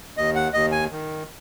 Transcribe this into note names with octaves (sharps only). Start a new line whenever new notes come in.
D#2 D#5
F#5
D#2 D#5
G#5
D#3